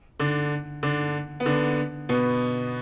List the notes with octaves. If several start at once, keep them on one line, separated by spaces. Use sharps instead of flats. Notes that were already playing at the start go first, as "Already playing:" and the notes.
D3 D4
D3 D4
B3
D3 D4
B2 B3